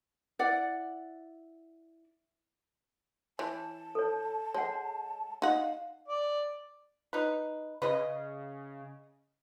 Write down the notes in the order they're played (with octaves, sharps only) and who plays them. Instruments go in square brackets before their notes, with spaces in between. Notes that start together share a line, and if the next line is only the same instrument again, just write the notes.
[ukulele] E4 D5 F#5
[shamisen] E3 [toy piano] C#5 [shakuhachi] A5
[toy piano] A4 C#5
[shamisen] G#3 [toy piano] C#5 F#5
[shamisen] D#4 F#5 [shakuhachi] F5
[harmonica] D5
[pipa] D#4 B4
[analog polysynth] C#3 [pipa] B4 D#5